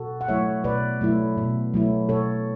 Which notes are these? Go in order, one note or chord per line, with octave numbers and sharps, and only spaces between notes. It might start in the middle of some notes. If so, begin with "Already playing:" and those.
Already playing: B2 F#4 A4
F#5
F#3 A3 E4 C#5 E5
B2 B4 D5
F#3 A3 E4
B2
F#3 A3 E4
B2 A4 C#5